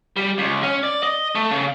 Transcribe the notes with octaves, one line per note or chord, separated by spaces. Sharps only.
G3
C#2
C#4
D5
D#5
A3
C#3